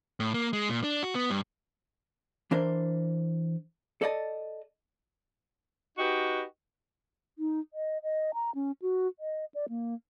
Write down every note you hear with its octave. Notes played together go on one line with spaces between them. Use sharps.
A2
A#3
G#3
A#2
D4
F#4
B3
G2
E3 D4 A#4 C5
A4 D5 D#5 A5
D#4 F#4 G4 B4 D#5
D#4
D#5
D#5
A#5
C#4
F#4
D#5
D5
A#3